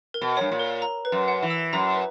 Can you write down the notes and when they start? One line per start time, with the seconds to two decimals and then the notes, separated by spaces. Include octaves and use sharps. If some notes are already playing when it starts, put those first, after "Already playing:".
0.14 A#4
0.21 B2
0.37 G2 C#5
0.52 A#2
0.59 A#4
0.82 A#5
1.05 B4
1.12 F#2
1.28 F#5
1.43 E3
1.50 E6
1.73 F#2 A#5
1.95 B4